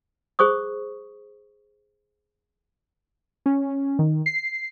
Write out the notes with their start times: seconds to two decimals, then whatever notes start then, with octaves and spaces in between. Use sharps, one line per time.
0.39 G#4 C5 C#6 D#6
3.46 C#4
3.99 D#3
4.26 C7